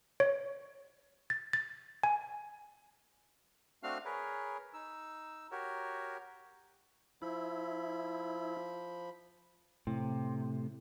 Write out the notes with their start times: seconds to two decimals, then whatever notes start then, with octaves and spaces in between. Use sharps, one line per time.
0.20 C#5
1.30 A6
1.53 A6
2.03 G#5
3.83 A3 C4 D4 F#4 F5 F6
4.05 G#4 A#4 B4 C#5
4.74 D#4 E6
5.51 F#4 G4 A#4 C#5
7.22 F3 E4 B5
9.87 A2 C3